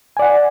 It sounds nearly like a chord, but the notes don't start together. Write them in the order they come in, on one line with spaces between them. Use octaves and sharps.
G#5 D5 F#5